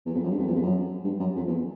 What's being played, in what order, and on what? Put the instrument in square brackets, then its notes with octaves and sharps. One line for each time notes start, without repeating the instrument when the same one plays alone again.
[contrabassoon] E2
F2
F#2
G2
F2
E2
F2
F#2
G2
F#2
F2
E2